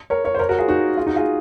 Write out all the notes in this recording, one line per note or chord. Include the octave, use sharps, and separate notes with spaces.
A#4 C#5
A#4 C#5
C5
A#4 C#5
F#4 A#4
F4 G#4
D#4 F#4
F4 G#4
D#4 F#4
F4 G#4